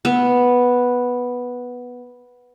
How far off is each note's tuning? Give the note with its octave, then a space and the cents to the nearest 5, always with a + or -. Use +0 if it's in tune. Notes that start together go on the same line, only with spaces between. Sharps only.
B3 -5